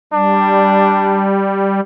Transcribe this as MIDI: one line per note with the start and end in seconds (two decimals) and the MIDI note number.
0.13 1.80 55
0.13 1.26 62